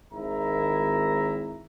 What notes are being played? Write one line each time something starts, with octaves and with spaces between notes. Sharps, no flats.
G#1 D#3 E4 A#5